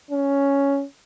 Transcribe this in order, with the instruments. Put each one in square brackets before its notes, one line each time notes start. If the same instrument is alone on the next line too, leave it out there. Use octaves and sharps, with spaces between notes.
[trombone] C#4